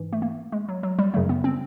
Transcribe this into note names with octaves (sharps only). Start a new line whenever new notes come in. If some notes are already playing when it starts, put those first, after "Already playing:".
Already playing: G#2 E3
A3
A#3
G#3
F#3
F#3
G3
F#2 C#3 F#3 A3
B3
C4